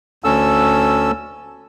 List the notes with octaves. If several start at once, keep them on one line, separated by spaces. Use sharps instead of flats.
D2 C#4 A4 E6